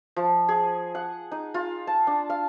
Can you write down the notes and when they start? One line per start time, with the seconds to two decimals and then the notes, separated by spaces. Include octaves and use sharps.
0.16 F3
0.49 G#4
0.95 F#5
1.32 D#4
1.54 F4
1.87 A5
2.07 D4
2.30 F5